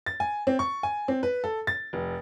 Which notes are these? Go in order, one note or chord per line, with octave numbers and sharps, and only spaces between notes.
A6
G#5
C4
C#6
G#5
C4
B4
A4
A6
F1